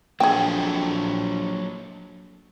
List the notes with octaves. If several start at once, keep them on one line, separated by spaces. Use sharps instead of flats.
A#1 F#3 G#4 A4 G5